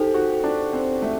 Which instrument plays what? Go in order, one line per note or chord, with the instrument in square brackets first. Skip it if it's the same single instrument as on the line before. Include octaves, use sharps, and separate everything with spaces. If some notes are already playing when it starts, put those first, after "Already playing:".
Already playing: [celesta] D#4 A4 C5 [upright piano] G4
[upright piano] F#4
D4
C4
A3